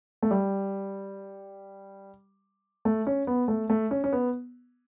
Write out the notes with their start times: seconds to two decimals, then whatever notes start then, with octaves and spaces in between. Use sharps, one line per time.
0.23 A3
0.31 G3
2.85 A3
3.07 C#4
3.27 B3
3.48 A3
3.70 A3
3.91 C#4
4.04 C#4
4.13 B3